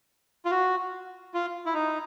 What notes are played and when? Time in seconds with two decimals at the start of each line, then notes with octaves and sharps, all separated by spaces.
0.45 F4
0.51 F#4
1.34 F4
1.66 E4
1.74 D#4